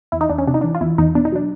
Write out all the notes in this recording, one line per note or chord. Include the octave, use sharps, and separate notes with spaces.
E2 E4
D#4
E2 D4
C#4
C3 D4
D#4
E3 D4
F4
E2 E4
E2 D#4
B2 D4
D#4
F#3 D4